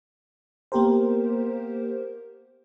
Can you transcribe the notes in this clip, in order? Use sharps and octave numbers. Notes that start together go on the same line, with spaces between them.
A#3 B3 G4 A#4 C5